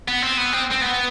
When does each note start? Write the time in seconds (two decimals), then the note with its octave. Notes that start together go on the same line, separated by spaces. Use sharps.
0.08 B3
0.22 C4
0.38 B3
0.52 C4
0.71 C4
0.81 B3